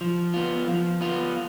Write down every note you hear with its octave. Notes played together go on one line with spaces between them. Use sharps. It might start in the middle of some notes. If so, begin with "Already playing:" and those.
F3
B3 F4
F3
B3 F4